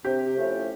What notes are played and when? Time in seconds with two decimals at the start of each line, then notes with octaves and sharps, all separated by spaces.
0.04 C3 G4
0.37 F3 A3 C#4 E4